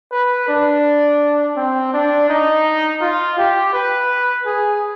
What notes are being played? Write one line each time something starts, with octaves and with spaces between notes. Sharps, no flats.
B4
D4
C4
D4
D#4
F4
G4
B4
G#4